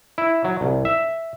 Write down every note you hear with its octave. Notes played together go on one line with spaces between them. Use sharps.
E4
F#3
C2
E5